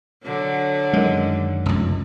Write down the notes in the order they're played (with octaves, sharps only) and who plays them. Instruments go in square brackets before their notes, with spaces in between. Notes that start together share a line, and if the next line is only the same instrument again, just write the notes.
[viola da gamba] D3 F#3
[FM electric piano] F#2 D#3 [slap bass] G#3
[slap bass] F1 C#2